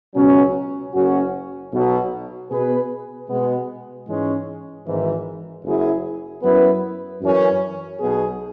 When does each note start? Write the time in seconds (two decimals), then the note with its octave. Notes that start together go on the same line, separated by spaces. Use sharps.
0.15 C#2 B2 F#3 C#4
0.93 F#1 F#2 F#3 C#4 F#4
1.73 B1 B2 F#3
2.50 B2 B3 G#4 B4
3.29 B2 G#3 B3
4.08 G#2 E3 G#3 C#4
4.86 G#1 G#2 E3
5.64 F#1 F#2 F#3 E4 G#4
6.42 F#2 F#3 B3 E4 B4
7.21 F#2 E3 C#4
7.99 B1 B2 B3 G#4